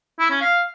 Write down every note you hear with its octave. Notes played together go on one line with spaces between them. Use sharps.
E4
C#4
F5